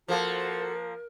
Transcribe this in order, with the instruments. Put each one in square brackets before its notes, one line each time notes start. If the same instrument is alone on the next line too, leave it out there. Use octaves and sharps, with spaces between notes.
[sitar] F3 A#3 [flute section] F#4 C5 A5 [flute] A4 [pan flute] A#4